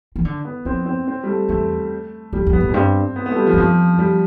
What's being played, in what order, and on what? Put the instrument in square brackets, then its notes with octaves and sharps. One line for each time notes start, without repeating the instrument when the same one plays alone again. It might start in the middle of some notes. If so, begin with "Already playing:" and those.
[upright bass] E3
D3
[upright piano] B3
[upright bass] F2 [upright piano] C4
[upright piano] C4
C4
G3
A3
[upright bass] E2 [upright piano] A3
[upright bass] F2 [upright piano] G3
[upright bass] F2
[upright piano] B3
[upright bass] A2
F2
[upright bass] G2 [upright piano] C4
[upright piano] B3
B3
A3
G3
F3
[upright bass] G2
[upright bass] F2 [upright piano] F3
[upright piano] G3